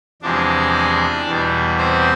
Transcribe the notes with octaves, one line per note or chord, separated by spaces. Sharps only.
E2 C3 F3 G#3 D4 D5
E2 B2 G3
C4 C5